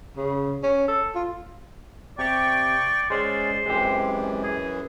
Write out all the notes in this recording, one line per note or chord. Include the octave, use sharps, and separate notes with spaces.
C#3
C#4
A4
F4
C3 G4 D5 G5 C#6
G#3 C#4 G#4 C5 D5
F#2 E3 G#3 C4 G4
G#4